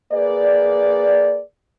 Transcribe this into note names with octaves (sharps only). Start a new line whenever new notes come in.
A#3 G#4 B4 D5